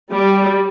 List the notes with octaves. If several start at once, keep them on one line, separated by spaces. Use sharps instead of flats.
G3